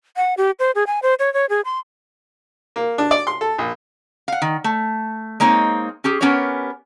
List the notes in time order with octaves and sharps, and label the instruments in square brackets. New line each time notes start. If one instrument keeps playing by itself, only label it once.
[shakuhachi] F#5
G4
C5
G#4
G#5
C5
C#5
C#5
G#4
C6
[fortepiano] A#3
D4
D5
C6
A4
A#1
[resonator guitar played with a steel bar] F5 F#5
D#3
A3
G#3 A#3 C4 D#4 C#5
C#4 G4 G#4
B3 C#4 G4 A#4 C#5